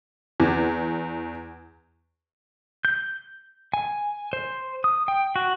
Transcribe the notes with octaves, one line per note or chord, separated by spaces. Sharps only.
E2
G6
G#5
C5
D#6
G5
F#4